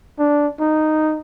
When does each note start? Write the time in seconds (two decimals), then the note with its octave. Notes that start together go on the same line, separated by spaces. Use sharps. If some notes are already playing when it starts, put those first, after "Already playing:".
0.19 D4
0.60 D#4